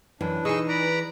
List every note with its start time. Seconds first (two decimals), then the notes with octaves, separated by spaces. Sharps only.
0.21 F#2 E3 D4
0.45 D#4 G#4 D#5 C#6 E6
0.68 B4 D5 A#5